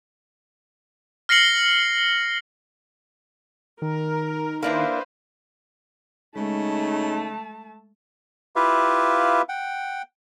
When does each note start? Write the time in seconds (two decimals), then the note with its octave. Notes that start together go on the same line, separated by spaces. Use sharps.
1.29 F6 A#6 C7 C#7 F#7 G7
3.82 D#3 A#4
4.63 A#3 D4 E4 B4 C5 F5
6.36 C#3 G#3 A3 D#4 A5
8.56 E4 F4 G4 B4 E5 F5
9.49 F#5 G5